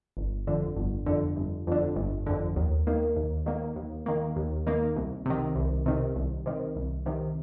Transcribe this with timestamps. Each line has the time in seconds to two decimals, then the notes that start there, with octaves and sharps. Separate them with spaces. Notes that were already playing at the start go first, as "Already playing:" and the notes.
0.17 G1
0.47 F2 D3
0.77 G1
1.06 F2 D3
1.36 G1
1.67 F2 D3
1.96 G1
2.26 F2 D3
2.56 D#2
2.87 D#3 A#3
3.17 D#2
3.46 D#3 A#3
3.76 D#2
4.06 D#3 A#3
4.36 D#2
4.67 D#3 A#3
4.96 C2
5.26 C3 D#3
5.56 C2
5.86 C3 D#3
6.16 C2
6.46 C3 D#3
6.76 C2
7.06 C3 D#3